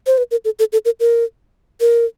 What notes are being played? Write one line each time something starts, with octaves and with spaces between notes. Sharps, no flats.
C5
B4
A#4
A4
A4
A4
A#4
A#4
A#4